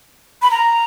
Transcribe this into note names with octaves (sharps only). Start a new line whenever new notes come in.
B5
A#5